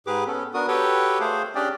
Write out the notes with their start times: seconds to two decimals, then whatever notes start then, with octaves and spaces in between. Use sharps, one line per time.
0.07 G#2 G4 G#4 B4 D6
0.27 B3 C#4 A4
0.54 B3 D4 F#4 A#4 D#6
0.68 F#4 G4 A4 B4 C#5 G5
1.21 A3 G#4 C5 F5
1.55 C#4 D4 G4 G#4 D5 G5